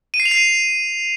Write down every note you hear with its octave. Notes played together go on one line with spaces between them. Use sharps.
D#7
C7
F7
C7
D#7